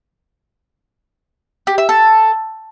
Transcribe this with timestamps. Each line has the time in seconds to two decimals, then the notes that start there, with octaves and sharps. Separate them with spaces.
1.67 G4
1.78 E5
1.89 A4